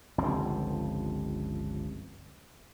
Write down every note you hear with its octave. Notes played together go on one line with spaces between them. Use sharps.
G1 C#2 F3 C4